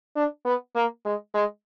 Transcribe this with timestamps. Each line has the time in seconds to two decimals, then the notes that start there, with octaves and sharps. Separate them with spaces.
0.16 D4
0.45 B3
0.75 A#3
1.05 G#3
1.35 G#3